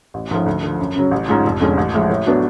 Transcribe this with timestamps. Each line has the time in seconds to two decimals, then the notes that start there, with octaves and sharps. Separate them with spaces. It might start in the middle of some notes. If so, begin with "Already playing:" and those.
0.14 A1
0.31 G#2 F3 A3 C#4
0.46 D2
0.63 D3 F3
0.79 F#2
0.96 C#3 F#3
1.11 A1
1.28 G#2 G#3 C#4 F4
1.45 F1
1.60 F2 D3 G#3 C#4
1.77 A1
1.94 A2 F3 G#3
2.10 A2
2.26 F#3 B3 D4 F#4